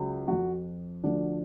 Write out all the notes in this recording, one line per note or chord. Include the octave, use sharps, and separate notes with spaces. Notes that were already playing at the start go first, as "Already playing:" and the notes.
Already playing: C#2 C#3 F#3
F2 F3 F#4
D2 D3 F3 D4